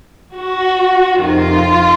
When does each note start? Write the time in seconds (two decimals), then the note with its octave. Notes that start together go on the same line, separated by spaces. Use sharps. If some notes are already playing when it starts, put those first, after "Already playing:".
0.34 F#4
1.15 F2 C3 D#3 F4